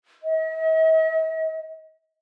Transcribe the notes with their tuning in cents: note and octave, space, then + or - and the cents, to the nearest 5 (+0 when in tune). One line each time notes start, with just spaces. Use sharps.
D#5 +45